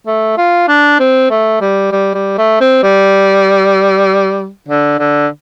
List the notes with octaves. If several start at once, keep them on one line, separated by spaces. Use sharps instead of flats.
A3
F4
D4
C4
A3
G3
G3
G3
A3
C4
G3
D3
D3